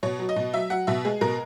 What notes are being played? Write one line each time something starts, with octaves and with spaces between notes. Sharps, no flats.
B2 C#5
F#3
D#5
B2
F#3 E5
F#3 F#5
B2 E5
G#3 G#4
B2 A#4